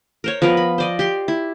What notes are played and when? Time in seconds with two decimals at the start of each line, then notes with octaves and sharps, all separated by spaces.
0.24 A#4 C5 C#5
0.42 F3 B3 A#4 B4
0.57 B5
0.78 C5 D5 D#5
0.99 G4 C6
1.28 E4